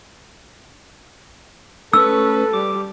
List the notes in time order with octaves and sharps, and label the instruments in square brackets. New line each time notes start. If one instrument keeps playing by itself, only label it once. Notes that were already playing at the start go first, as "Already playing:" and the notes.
[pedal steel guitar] A3 C#4 C#6 [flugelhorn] A4 [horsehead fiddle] B4 [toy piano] E6
[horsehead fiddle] G3 [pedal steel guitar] D6